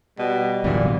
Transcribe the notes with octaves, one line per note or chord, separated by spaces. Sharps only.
B2 G3
D1 B1 E2 A#2 D3 E3